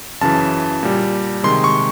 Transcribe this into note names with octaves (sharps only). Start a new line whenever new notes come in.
F#2 C#3 E3 A5
A#2 G3
C3 D#3 G#3 C6
C#6